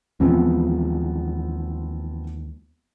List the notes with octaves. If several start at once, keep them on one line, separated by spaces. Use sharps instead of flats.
D#2 E3 F3 G#3 B3 C4